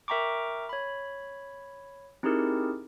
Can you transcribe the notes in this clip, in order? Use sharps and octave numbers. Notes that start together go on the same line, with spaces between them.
A#4 E5 G5 A#5 C#6 D6
C#5 B5
C4 D#4 E4 G4 G#4 A#4